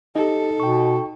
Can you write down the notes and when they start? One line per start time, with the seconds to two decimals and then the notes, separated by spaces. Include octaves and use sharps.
0.16 D#4 G4 A4 D#5
0.60 B2 G5 C#6